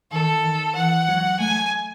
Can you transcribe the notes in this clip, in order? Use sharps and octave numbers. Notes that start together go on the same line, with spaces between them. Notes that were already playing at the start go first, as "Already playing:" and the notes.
D#3 A4
D#3
E3 F#5
F#3
A3 G#5